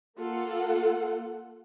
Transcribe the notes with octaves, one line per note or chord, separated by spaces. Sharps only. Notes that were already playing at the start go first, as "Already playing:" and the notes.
A#3 F4 A4 F#5